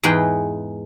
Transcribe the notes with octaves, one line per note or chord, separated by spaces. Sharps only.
E2 G#2 G#3 G#4 B4 G5